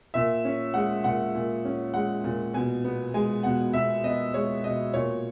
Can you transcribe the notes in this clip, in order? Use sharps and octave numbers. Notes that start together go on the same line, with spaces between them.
A#2 E5
C#4
G#3 F#5
A#2 F#5
A#2
C#4
G#3 F#5
A#2
B2 G#5
B3
G#3 G#5
B2 F#5
B2 E5
B3 D#5
G#3 C#5
B2 D#5
A#2 C#5